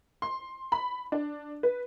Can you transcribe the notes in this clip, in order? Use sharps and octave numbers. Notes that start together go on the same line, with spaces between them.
C6
B5
D4
B4